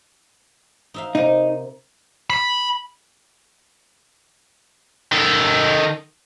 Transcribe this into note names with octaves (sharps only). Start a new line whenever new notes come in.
D#4 E5 F5
C3 D#4 A#4
B5
D#3 A4